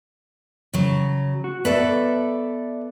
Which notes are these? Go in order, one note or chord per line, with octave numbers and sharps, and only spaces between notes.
C#3 F#3
F#4
B3 A4 B4 D5 E5